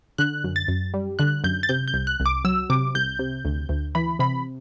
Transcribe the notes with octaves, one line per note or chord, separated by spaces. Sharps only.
D3 F#6
F#2
A6
F#2
G3
D3 F#6
F#2 G6
A6
C3 G6
G6
C2
F#6
C2
D6
F#3 E6
C3 D6
C2 G6
C3
D2
D2
E3 B5
C3 B5